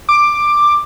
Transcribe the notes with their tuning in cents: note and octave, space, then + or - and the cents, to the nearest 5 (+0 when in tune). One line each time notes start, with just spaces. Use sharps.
D6 +10